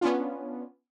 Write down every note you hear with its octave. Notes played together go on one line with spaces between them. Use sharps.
B3 C#4 D4 F4